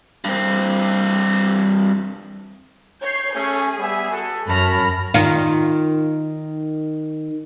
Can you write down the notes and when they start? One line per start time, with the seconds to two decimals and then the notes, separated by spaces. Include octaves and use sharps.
0.25 G2 C4
3.02 C#5 G6 C7
3.35 A3 C#4 G#4
3.79 G3 B3 E5
4.10 F#4 A4
4.47 F#2 C#5 A5 B5 F6 A#6
5.14 D#3 F4